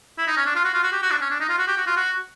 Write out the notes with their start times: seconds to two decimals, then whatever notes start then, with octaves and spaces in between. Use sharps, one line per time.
0.18 E4
0.27 D#4
0.37 C#4
0.46 D4
0.55 F4
0.65 F#4
0.74 F4
0.83 F#4
0.92 G4
1.03 F#4
1.11 D4
1.21 C#4
1.31 D4
1.40 D#4
1.49 F4
1.58 F#4
1.68 G4
1.78 F#4
1.87 F4
1.96 F#4